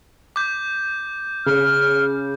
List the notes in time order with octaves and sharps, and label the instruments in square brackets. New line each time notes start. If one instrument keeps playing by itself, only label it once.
[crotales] D6 G6
[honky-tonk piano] C#3 [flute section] F6